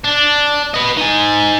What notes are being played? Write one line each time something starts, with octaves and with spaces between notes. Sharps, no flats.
D4
B4 D#5
D#4 G#5